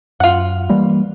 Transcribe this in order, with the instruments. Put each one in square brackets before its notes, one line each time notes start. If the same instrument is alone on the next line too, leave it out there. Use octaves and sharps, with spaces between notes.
[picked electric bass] F#2 [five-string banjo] F4 F#5
[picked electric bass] E3 G3 A#3